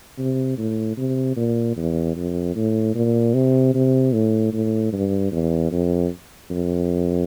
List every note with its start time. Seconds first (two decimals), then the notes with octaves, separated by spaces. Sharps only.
0.18 C3
0.58 A2
0.97 C3
1.37 A#2
1.77 E2
2.16 F2
2.56 A2
2.95 A#2
3.34 C3
3.75 C3
4.13 A2
4.53 A2
4.93 G2
5.32 E2
5.72 F2
6.50 F2